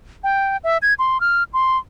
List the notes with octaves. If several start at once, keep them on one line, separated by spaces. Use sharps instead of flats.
G5
E5
G#6
C6
F6
C6